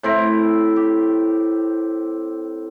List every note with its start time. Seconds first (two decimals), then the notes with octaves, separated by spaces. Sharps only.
0.03 A2 C4 E4 A#4
0.76 G4